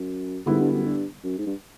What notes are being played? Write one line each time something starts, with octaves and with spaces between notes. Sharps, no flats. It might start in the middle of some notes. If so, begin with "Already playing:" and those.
Already playing: F#2
G#2 D3 G3 B3 E4
G2
F#2
G2
F#2
G#2
G2